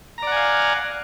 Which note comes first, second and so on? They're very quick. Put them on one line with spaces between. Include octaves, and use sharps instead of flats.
A#5 D5 F#5 G#5 F5